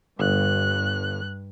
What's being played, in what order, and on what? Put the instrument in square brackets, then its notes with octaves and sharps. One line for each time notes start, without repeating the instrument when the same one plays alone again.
[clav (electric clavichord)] G1 [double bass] G2 [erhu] F#6